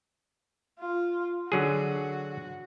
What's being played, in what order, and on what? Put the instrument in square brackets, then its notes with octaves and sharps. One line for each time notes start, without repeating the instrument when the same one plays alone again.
[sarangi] F4
[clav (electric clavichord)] D3 F#3 G#4 [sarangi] F#4